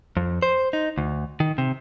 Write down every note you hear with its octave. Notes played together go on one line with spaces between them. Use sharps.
F2
C5
D#4
D2
D#3
C3